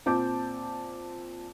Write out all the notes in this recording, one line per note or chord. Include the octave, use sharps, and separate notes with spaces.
A#2 C4 C5 A5 D6 G6